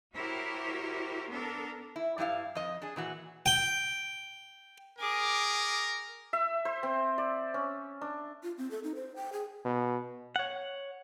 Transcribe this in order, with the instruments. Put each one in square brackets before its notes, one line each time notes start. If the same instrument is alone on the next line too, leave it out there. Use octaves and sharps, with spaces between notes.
[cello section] E4 F#4 G4 A#4 C5 C#5
B3 D4 A4 A#4
[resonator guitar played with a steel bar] E4
G2 G3 E4 F5
F2 D#5
D4 G#4
A#2 E3 F#4
[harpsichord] G5
[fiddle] G#4 D6 [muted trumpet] A#4
[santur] E5
C5
C4
D5
C#4
D4
[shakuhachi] F4
C4
A4
D#4
C5
G5
G#4
[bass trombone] B2
[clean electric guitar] C#5 F#5